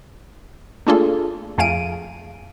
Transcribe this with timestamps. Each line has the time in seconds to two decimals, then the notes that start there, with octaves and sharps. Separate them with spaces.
0.87 A3 A#3 D4 F4 G#4 A4
1.58 F2 A3 G#4 F5 D7 D#7